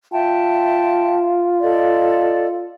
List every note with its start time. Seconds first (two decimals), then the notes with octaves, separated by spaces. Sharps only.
0.12 F4 E5 G5 A5
1.61 A4 D5 D#5